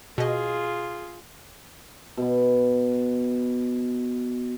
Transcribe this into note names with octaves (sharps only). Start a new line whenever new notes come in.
B2 F4 G#4 D#5
B2 B3